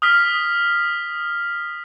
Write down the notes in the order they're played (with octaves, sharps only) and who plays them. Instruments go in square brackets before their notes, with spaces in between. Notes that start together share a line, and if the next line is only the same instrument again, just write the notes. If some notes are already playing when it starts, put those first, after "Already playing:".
[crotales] D#6 F6 B6